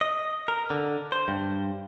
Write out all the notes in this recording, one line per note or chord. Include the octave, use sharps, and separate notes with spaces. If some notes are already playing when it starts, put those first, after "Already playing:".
D#5
A#4
D3
C5
G2